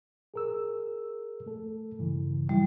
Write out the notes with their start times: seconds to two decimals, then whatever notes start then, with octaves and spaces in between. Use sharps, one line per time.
0.34 G#4 A#4 E6
1.46 A3 A4
1.99 G2 C#3 E3
2.49 F#3 G3 E4